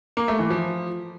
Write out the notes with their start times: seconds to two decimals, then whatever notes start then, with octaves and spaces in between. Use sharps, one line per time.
0.17 A#3
0.28 A3
0.39 E3
0.50 F3